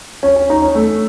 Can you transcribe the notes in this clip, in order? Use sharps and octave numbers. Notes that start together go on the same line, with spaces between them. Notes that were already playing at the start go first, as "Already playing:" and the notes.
C#4
C#4
D#4
C#4
A3